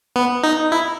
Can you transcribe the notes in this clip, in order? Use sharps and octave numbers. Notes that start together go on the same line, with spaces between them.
B3
D#4
E4